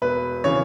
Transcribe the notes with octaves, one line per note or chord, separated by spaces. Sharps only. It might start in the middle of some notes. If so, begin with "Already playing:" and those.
E1 B4
C#3 E3 C#5